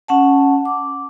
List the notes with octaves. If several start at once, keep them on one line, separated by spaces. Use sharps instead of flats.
C#4 F#5 A5
D6